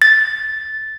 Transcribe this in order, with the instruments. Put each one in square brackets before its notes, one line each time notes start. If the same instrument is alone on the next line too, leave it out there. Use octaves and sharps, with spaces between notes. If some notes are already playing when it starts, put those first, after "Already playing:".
[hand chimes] A6